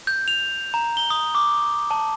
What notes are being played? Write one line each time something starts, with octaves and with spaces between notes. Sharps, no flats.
G6
F7
A#5
G7
D#6
D6
A5